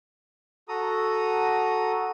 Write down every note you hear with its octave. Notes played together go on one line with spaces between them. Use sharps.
F#4 A4 A#5 D#6